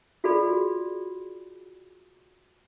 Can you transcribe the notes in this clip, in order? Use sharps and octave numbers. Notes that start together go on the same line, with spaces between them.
F4 F#4 G#4 A4 D5 B5